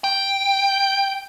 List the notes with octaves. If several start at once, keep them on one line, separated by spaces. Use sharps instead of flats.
G5